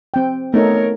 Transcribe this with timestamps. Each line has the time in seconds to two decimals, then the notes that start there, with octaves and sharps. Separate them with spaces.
0.14 C4 G5
0.54 A3 B3 D#4 A4 A#4 C#5